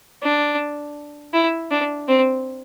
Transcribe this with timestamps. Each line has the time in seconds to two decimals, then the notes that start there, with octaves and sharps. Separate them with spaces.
0.22 D4
1.34 E4
1.71 D4
2.08 C4